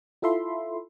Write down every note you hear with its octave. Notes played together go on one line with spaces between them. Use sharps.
E4 F4 A4 E5 B5 C6